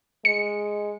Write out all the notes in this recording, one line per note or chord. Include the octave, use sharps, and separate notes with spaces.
G#3 C#7